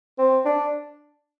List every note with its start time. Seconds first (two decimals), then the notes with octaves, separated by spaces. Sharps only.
0.19 C4
0.46 D4